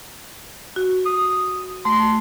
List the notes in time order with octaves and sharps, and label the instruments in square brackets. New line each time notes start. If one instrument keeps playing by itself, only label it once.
[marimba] F#4
[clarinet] D#6
[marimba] A3 [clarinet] C6
[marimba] A5